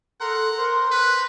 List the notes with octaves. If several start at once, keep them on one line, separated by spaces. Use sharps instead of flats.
A4 A#4 F#5 A#5 C6
A#4 C5 A#5 C6
B4 F#6